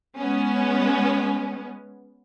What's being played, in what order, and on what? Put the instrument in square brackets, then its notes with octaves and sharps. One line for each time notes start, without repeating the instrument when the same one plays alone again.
[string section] G#3 B3 C#4